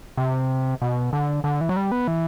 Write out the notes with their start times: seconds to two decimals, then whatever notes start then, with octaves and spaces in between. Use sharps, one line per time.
0.17 C3
0.82 B2
1.13 D3
1.44 D3
1.61 E3
1.69 F#3
1.76 G3
1.92 B3
2.08 E3